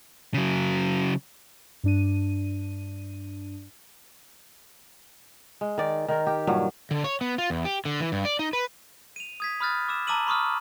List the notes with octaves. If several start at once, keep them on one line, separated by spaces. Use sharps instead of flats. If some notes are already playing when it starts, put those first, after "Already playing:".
C#3 F#3
G2 D4 D#7
G#3
D#3 D5
D#3 A#4
G4
G2 A#2 F#3
D3
C#5
B3
F4
E2
G4
D3
E3
G2
D5
D#4
B4
D#7 F7
D#6 G#6 B6
B5 D#6 F6 F#6 A6
D6 E6 E7
A5 A#5 D6 E6 D#7 F#7
B5 C#6 D#6 F6